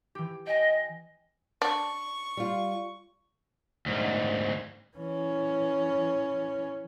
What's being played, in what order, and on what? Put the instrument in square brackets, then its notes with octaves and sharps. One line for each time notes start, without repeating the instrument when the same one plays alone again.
[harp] E3 G4
[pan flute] D#5 [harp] G5 G#5
[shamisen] D4 [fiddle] C#6
[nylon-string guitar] G3 F4
[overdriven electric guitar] D2 G#2
[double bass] E3 C#4